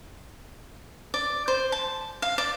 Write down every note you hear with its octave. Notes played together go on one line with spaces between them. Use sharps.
D5
C5
A5
F5
D5